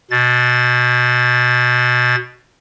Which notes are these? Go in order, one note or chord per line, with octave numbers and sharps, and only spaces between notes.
B2 A6